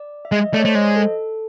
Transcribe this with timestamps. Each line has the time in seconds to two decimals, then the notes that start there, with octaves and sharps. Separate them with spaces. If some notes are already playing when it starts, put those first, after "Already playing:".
Already playing: D5
0.25 E5
0.31 G#3 D#5
0.54 A3 D5
0.59 C#5
0.64 A3 C5
0.75 G#3 D#5
0.96 A4